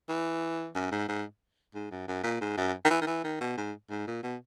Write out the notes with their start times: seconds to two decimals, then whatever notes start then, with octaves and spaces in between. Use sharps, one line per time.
0.09 E3
0.75 F#2
0.92 G#2
1.08 G#2
1.75 G#2
1.91 F#2
2.08 F#2
2.23 A#2
2.41 G#2
2.58 F#2
2.85 D#3
2.90 E3
3.01 D#3
3.07 E3
3.24 D#3
3.41 B2
3.57 G#2
3.90 G#2
4.07 A#2
4.23 B2